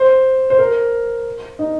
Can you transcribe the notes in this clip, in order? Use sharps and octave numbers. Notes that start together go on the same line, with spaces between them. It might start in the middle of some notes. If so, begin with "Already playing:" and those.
Already playing: C5
C5
A#4
D#4